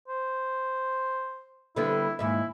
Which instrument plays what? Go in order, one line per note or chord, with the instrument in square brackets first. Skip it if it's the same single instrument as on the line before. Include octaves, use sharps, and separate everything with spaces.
[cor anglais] C5
[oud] D3 G3 B3 [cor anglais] E4
[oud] D#2 G#2 E5 [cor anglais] E4